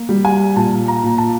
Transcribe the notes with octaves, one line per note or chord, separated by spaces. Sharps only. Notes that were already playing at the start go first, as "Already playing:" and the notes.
Already playing: A#3
G3
G#5
A#2 A5
A#5
A#2
A5